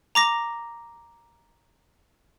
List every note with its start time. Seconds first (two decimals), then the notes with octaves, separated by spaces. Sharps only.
0.15 A#5 D6 A#6